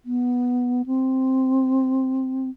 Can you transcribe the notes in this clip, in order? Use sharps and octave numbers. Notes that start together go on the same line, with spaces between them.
B3
C4